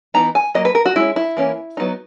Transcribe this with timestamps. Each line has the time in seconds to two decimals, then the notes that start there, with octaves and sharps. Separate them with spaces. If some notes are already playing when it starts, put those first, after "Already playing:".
0.14 E3 B3 D#4 A#5
0.35 G#5
0.55 F#3 A#3 D#5
0.65 B4
0.75 A#4
0.86 F#4
0.96 G#3 C#4 E4
1.16 E4
1.37 E3 A#3 C#4
1.77 F#3 B3 D#4